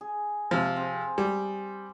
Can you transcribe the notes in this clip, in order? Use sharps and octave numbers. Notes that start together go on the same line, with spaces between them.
G#4
C3 F3
C4 G#4
G3